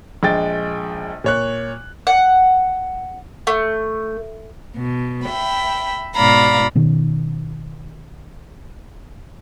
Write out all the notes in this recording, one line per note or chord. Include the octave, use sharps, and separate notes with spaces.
A#1 G#3 G5 A6
A#2 C#5 F#6
F#5
A3
B2
E5 G5 B5
G#2 B2 D5 F5 A#5 B5
B2 D#3 C#4